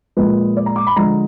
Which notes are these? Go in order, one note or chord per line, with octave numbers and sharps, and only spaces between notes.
A#2 F3 G#3 B4
D5
A#5
D6
B5
D3 F3 G#3 A#5